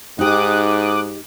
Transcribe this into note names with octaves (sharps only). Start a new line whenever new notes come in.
G#2 D#4 G4 D6 D#6 F#6